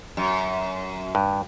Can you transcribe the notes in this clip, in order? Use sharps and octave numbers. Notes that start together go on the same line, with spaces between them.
F#2
G2